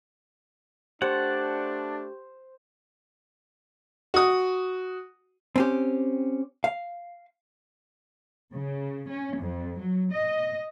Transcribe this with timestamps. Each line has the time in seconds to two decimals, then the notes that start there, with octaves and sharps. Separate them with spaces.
1.02 A3 D4 G4 C5 D5 F#5
4.14 F#4 D#6
5.56 C4 C#4 G4
6.64 F5
8.53 C#3
9.09 C#4
9.39 F2
9.80 F#3
10.13 D#5